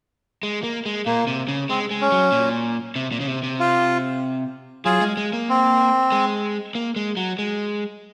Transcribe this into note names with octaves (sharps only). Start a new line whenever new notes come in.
G#3
A#3
G#3
A#2 A#3
C3
C#3
G#3 C4
G#3
C#4
F#3
A#2
C3
A#2
C#3
C3
C3
F4
F#3 F4 G#4
G#3
G#3
A#3
C4
G#3
A#3
G#3
F#3
G#3